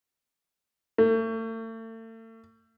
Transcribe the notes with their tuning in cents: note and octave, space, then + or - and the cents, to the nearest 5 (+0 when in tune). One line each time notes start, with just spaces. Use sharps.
A3 +40